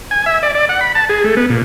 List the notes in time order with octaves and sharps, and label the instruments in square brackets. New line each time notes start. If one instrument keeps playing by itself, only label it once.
[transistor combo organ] G#5
E5
D5
D5
F#5
B5
A5
G#4
A3
B3
A#2